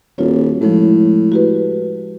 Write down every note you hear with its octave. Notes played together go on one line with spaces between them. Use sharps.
D#1 F4 F#4 C#5
A2 F3 G#3
F#4 G4 B4